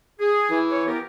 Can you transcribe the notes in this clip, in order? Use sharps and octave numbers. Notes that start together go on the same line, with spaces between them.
G#4
E3
C#5
B3 G4 A#4